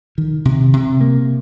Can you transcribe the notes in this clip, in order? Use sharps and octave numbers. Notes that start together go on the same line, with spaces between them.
D#3
C3
C3
A#3